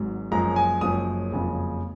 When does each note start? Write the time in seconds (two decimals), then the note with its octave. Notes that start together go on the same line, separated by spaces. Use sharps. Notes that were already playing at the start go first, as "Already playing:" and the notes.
Already playing: G#1 G#2 F#3
0.31 F#1 F#2 F3 G#3 A#5
0.56 G#5
0.81 F#1 F#2 F3 G#3 D#6
1.32 F#1 F2 C#3 F3 G#3